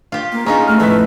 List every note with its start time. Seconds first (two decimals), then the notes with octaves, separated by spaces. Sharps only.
0.12 F4 G4
0.32 A#3
0.46 C#4 D#4 F4 G#4 A#5
0.67 A3 F6
0.80 F2 A2 A3 B4 B6